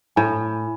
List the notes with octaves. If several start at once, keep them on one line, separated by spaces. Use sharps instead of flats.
A2 G#5 B5